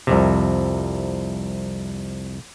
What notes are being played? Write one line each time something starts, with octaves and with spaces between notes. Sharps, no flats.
C2 F2 C3